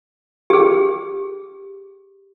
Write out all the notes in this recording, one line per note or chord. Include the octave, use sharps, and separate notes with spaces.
G4 G#4